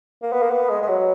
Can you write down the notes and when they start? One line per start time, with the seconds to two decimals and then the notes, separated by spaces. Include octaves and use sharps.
0.23 A#3
0.32 B3
0.43 A#3
0.51 B3
0.70 G#3
0.82 G#3
0.89 F#3